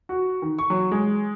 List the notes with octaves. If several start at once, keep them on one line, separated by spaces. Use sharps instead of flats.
F#4
D#3
C#6
F#3
G#3